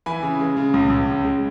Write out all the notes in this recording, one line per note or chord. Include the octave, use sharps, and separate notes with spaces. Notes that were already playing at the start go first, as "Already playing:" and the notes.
E3 G#5 B5
C#3
G#3
C#3
C#2
C#2
C#3
G#3